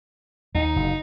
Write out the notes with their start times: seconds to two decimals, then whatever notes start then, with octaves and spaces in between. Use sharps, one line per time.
0.55 D#2 D#4
0.76 F#1